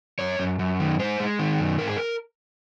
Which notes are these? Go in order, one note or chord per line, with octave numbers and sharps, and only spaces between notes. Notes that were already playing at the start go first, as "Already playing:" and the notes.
F#2 C#5
F#2
F#2
D#3
G#3 C5
G#3
D#3
F#2
G#2 A#4
G#4
A#4